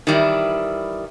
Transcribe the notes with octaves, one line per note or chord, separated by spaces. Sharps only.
D#3 E3 G3 E4